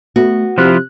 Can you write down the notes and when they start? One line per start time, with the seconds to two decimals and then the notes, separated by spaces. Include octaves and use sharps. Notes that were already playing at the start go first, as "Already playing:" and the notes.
0.16 A3 B3 F#4
0.58 C3 F3 E4 F4 F#6